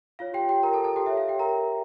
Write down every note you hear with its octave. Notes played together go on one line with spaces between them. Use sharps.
F4 C#5 F5
G4 G5
G4 G5
A#4 A#5
A4 A5
A4 A5
G4 G5
G4 C#5 E5
F5
G4 G5
A#4 A#5